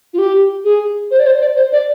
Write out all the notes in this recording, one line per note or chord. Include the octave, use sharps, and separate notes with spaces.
F4
G4
G#4
C5
D5
C5
D5
C5
D5